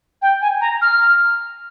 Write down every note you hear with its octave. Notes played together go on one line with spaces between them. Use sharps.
G5
G#5
A#5
F6